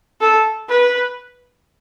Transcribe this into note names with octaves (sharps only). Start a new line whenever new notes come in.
A4
B4